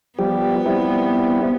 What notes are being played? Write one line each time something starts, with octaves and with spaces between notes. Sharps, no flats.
F3 G3 B3 G4
G3 C4 E4